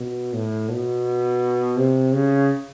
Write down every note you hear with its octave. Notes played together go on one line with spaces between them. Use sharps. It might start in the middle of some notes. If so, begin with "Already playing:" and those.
Already playing: B2
A2
B2
C3
C#3